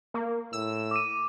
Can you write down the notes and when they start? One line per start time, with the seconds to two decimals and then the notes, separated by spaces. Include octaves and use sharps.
0.14 A#3
0.53 A2 E6
0.91 D6 D#7